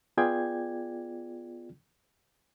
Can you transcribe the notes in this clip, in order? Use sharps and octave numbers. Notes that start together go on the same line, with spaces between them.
B3 F4 G#4 D5 G5 G#6